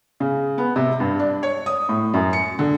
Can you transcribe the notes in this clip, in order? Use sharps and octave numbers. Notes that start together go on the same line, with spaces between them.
C#3
B3
C3
G2
D4
C#5
D#6
A2
F#2
C#7
D3